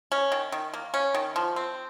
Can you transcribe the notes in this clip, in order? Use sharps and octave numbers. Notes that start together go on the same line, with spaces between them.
C#4
D#3
D#3
A#3
C#4
D#3
F3
C4